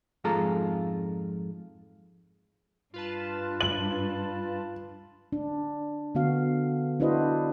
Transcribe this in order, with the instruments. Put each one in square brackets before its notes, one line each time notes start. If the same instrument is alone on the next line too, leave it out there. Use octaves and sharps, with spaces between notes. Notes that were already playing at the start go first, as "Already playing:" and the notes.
[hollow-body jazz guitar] F2 G#2 G#3 F4 A4 A#5
[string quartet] G2 [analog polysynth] F4 B4 A5
[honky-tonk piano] F#7
[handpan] D4
D3 B3 F#4 F5
D4 E4 F#4 B4 C5 D#5